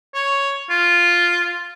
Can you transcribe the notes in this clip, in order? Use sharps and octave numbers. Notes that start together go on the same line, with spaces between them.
C#5
F4